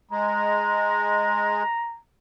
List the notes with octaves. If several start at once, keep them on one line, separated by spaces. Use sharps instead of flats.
G#3 A#5